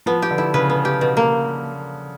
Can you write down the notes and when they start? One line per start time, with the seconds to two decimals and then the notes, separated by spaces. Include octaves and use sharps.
0.06 F3 B3
0.22 G4
0.31 D3
0.38 E4
0.54 C#3 B4
0.70 B3
0.85 G4
1.01 B2
1.17 A#3